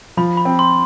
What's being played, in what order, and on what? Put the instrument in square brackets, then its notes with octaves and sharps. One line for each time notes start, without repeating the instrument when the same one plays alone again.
[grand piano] F3 [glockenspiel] B5
[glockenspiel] B5
[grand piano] C4
[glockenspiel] C6